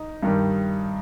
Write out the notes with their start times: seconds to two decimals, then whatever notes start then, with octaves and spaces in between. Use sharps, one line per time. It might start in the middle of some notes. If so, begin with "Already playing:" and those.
Already playing: D#4
0.23 G2 D#3 G3